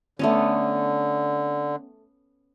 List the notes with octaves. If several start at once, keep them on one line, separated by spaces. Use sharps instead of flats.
D3 A3 B3 C#4